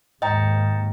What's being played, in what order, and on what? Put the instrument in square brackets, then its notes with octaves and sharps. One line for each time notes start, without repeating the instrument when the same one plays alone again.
[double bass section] D#2 G#2 [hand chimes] D#5 G5 A#5